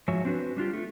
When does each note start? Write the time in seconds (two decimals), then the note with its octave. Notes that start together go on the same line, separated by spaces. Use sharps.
0.08 G#2 F3 F#3 C#5 E5 G#5
0.25 C4 D4 F#4 B4
0.57 G3 D4 F4 G4
0.73 A3